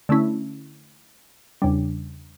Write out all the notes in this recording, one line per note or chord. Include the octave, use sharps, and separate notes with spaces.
D3 A3 C#4 E4
E2 C#3 G3 D4